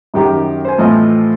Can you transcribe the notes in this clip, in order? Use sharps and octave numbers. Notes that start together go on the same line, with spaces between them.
F#2 D#3 G4 A#5
C5 G#5
A2 E3 F3 C4 D#5 F5